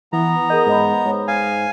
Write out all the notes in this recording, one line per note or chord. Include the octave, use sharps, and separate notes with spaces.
E3 B3 A#5
G#4 A#4 D#5 G6
G#2 C5 D#5 B5
G#2 C#5
F5 G#5